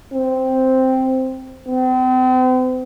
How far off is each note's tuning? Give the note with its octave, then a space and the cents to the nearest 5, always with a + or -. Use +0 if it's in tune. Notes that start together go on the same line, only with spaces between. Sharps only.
C4 -5
C4 -40